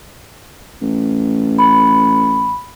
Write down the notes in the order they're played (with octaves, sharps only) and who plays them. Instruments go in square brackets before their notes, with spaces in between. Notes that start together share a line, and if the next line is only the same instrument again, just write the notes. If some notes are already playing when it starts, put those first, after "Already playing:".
[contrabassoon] A1
[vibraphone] B5